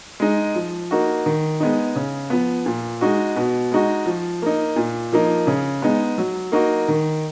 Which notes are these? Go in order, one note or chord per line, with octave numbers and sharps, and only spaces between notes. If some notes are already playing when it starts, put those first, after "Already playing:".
G#3 D#4
F3
A#3 D#4 F#4
D#3
G#3 B3 D#4
C#3
F3 B3
A#2
G#3 D#4 F#4
B2
G#3 D#4 F#4
F3
A#3 D#4
A#2
F3 A#3 D#4
C#3
G#3 B3 D#4
F#3
A#3 D#4 F#4
D#3